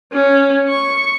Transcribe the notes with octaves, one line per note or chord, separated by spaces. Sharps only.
C#4
C#6